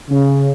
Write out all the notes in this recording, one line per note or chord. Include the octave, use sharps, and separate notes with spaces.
C#3